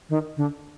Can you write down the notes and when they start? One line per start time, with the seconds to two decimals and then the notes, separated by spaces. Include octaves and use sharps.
0.10 D#3
0.37 D3